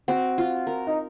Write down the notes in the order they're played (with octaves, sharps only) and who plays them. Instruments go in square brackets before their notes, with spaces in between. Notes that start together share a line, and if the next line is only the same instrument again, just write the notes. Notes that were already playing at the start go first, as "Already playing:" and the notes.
[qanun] C4 [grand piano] F#4
[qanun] F4
A#4
[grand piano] D#4